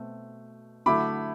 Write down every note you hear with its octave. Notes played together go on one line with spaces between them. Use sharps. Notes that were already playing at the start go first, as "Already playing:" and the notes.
Already playing: B2 A3 C4
D3 F#3 A3 E4 B5 D6